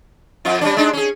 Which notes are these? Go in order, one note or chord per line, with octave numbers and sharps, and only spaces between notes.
F2 F4
G3 C#4 D4
G#3 D4 D#4
C#4 G#4